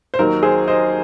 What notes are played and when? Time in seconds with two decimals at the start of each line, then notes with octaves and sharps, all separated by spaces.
0.14 C5
0.19 D#2 D#3 F#3 A#4
0.43 G#4 C5
0.67 C5 D#5